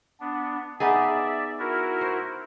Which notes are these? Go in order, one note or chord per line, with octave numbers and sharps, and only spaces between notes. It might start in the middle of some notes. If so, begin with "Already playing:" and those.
B3 D4
B3 D#4 G#4 D5 E5
E4 F#4 A#4
C5